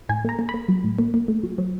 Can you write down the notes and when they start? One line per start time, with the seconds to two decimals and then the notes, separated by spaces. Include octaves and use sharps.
0.09 A2 G#5
0.24 A#3 A#5
0.39 A#3
0.49 B5
0.54 A#3
0.68 F#3
0.84 A2
0.99 A#3
1.14 A#3
1.28 A3
1.43 F#3
1.58 F#3